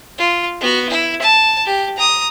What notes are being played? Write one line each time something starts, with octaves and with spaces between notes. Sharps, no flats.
F4
B3 F#4
E4
A5
G4
A#5 D#6